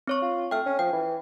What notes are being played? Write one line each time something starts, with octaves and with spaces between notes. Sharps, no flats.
C4 C#5 C#6
F4
A3 G5 F6
C#4
F3 G5
E3